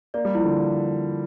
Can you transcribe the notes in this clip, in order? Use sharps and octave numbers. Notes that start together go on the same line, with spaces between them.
A#3 D5
G3
F3 E4
D3